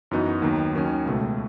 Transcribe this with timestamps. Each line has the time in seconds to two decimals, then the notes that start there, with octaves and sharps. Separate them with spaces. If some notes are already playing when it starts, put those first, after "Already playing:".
0.11 F#2 E3 B3 D#4 F#4
0.42 D#2 D#3 F#3 B3
0.73 D#2 D#3 F#3 C#4
1.06 C#2 B2 A3